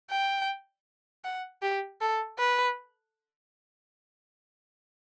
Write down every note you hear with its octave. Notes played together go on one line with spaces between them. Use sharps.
G5
F#5
G4
A4
B4